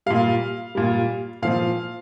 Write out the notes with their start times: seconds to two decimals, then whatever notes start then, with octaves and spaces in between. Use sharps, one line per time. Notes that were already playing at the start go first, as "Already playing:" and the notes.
0.06 A#2 G3 F5
0.75 A#2 G3
1.42 A#2 F3 F5